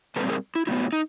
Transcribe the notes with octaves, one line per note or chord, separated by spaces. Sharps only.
A#2 G3 C4 A4 B4
G#4 A#4
E4
A2 F#3 B3 E4
D#4